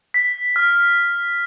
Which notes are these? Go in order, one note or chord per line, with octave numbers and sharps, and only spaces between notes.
B6
F6